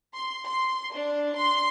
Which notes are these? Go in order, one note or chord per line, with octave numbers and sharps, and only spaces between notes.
C6
C6
D4
C6